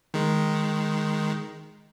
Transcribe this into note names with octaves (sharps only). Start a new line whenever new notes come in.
D#3 G#3